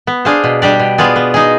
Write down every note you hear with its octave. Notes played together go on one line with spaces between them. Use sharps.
B3
D4 G#4 C5 F5
B2
G3 D4 G4 D5
B2
B3 F4 G#4 D5
B3
D#4 G#4